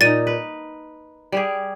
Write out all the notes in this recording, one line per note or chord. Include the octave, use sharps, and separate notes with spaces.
A#2 D#4 A6 D#7
B4
G3 G4 G#4